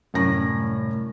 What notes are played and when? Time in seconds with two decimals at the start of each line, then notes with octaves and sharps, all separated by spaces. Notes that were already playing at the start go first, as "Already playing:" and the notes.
0.14 C2 F#2 A2 A#6